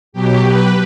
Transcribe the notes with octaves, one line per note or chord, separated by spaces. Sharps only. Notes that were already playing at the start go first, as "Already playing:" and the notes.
B2 F#3 G4
B4